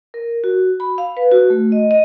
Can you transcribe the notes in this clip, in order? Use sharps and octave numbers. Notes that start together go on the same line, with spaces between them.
A#4
F#4
B5
F5
B4
F#4
A3
D#5
D#5